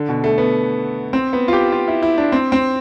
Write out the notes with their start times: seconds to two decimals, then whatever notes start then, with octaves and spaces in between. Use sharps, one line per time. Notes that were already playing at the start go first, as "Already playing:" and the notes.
Already playing: D3
0.09 B2
0.24 A3
0.38 B3
1.13 C4
1.33 B3
1.48 F4
1.53 G4
1.72 F4
1.88 E4
2.03 E4
2.18 D4
2.32 C4
2.52 C4